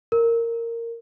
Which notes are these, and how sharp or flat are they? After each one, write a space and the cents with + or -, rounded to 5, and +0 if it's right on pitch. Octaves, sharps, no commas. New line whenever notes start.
A#4 -15